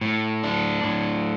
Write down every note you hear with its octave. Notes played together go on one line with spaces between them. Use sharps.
A2
D4
A2